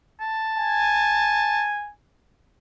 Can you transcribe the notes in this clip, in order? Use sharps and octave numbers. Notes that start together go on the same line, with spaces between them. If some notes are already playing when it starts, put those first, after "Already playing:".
A5
G#5